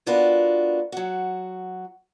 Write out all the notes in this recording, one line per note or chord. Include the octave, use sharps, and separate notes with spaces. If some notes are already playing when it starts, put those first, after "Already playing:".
B3 D4 F4 F#4 A#4 B4
F#3 F#4